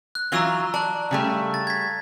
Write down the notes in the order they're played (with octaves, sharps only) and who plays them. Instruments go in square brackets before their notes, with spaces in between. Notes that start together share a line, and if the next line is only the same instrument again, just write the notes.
[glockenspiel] F#6
[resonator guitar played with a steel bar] E3 F#3 F4 [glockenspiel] A#5 E6 G7
[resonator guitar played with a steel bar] D5 [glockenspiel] A5 F#6
[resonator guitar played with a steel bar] C#3 G3 A3
[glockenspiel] A6
G#6 B6